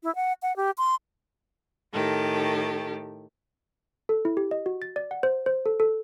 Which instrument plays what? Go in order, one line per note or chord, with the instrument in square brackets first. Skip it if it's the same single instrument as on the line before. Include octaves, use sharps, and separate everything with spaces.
[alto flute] E4
F#5
F#5
G4
C6
[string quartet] A2 D#3 G4 A4
[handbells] A4
E4
G4
D#5
F#4
A6
D5
F#5
C5
C5
A4
A4